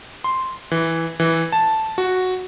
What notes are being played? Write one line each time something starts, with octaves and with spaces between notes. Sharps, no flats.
C6
E3
E3
A5
F#4